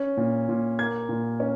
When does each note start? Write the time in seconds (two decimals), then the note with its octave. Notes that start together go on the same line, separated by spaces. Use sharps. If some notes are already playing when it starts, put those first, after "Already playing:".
Already playing: C#4
0.17 A#2
0.49 A#2
0.79 A#3 G#6
1.09 A#2
1.40 C#4